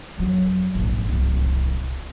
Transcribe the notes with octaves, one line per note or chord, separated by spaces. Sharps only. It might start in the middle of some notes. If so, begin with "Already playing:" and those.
F2 F#3
A#1 G#2
D1 C2